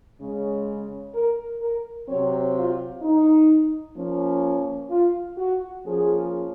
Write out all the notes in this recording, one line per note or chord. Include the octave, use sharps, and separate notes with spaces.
C#3 G#3 C#4
A#4
A#4
C3 F#3 C4 C#5
F4
D#4
F3 A#3 C#4
F4
F#4
F3 A#3 C#4 G#4